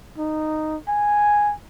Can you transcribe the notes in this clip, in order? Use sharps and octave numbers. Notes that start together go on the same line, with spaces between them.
D#4
G#5